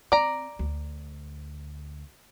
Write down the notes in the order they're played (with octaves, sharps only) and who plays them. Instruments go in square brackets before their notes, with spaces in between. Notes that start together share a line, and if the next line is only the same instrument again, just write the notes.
[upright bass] C4 [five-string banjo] D5 A#5
[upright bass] D2